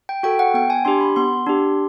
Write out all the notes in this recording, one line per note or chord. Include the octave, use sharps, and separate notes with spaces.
G5
F#4 A4 G5
F#5
B3 G5
G#5
D4 G4 C6
B5
B3 C6
D4 G4